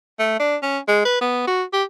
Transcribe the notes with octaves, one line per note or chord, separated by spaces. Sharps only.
A3
D4
C#4
G#3
B4
B3
F#4
G4